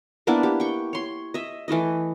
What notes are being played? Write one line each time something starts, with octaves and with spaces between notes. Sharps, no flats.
A#3 B3 D4 E4
G4
G5 C#6
C#5 C6
D#5 E5
E3 A3 E4 D#5